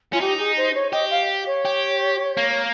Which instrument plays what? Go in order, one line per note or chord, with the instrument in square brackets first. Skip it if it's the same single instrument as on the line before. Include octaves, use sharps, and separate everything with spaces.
[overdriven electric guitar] C#4 [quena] F4
[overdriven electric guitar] D#4 [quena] G4
[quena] G#4
C5
C#5
[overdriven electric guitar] G4 [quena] D#5
[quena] F5
C#5
[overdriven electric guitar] G4
A#3